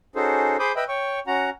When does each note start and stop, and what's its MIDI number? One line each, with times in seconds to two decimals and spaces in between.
0.16 0.57 61
0.16 0.57 63
0.16 0.57 66
0.16 0.57 68
0.16 0.57 69
0.16 0.57 72
0.59 0.72 68
0.59 0.72 72
0.59 0.72 83
0.59 0.72 86
0.59 0.72 87
0.59 0.72 91
0.76 0.85 71
0.76 0.85 75
0.76 0.85 76
0.76 0.85 79
0.76 0.85 83
0.88 1.20 73
0.88 1.20 79
0.88 1.20 85
1.27 1.50 61
1.27 1.50 66
1.27 1.50 78
1.27 1.50 82